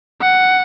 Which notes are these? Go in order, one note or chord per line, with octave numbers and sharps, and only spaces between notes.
F#5